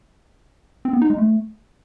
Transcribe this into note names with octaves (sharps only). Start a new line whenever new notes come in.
C4
B3
D#4
G#3
A3